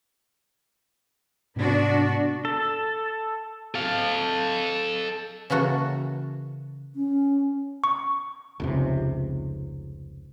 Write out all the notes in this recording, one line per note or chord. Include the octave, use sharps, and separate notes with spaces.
G#2 C3 B3 D4 F#4
A4
A4 F5
C#3 E3 A#3 F#4 A4
C#4
C#6
F1 C#2 C3